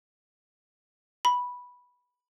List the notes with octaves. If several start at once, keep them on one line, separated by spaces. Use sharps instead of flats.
B5